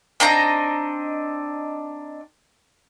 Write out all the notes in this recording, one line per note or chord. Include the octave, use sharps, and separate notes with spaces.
C4 D4 D#4 A#5